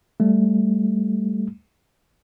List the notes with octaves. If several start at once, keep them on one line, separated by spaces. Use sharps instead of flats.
G3 A3